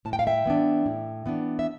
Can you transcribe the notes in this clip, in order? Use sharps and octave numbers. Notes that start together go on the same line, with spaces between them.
A2 A5
G5
F5
E5 G5
E3 B3 D4
A2
E3 B3 D4
E5